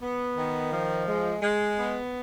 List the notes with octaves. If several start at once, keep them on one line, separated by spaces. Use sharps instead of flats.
B3
D#3
F3
G#3
G#3
B3